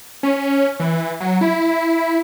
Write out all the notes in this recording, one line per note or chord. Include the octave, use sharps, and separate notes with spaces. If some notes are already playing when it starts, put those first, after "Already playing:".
C#4
E3
F#3
E4